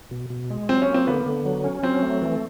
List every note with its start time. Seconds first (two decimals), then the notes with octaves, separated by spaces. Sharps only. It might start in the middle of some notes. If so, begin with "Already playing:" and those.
0.11 B2
0.30 B2
0.50 G#3
0.69 F#3 C4
0.82 C#4
0.88 A#3
0.94 C4
1.07 D3 B3
1.26 D3
1.45 F#3
1.64 C#4
1.83 F#3 C4
2.02 A3
2.22 E3